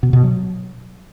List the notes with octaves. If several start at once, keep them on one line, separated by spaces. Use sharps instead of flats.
B2
B2
F#3